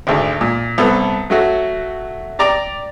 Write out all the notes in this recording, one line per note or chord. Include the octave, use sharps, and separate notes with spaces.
G#1 D2
A#2
C2 B3 A4
F#3 A3 F#4
G4 D5 A#5 D6